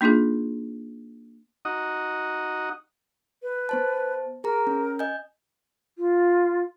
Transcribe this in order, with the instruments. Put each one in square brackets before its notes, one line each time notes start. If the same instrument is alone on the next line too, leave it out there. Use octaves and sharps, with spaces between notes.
[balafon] A#3 D4 D#4 F4 G#4
[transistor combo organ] D#4 F#4 D#5
[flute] B4
[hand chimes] B3 C5 A5
[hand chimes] G#4 A#5 [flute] A#4
[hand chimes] C#4
D#5 G#5 G6
[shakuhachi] F4